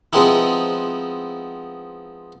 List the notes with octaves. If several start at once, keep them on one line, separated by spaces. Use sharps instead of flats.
F3 G#3 B3 C4 D#4 E4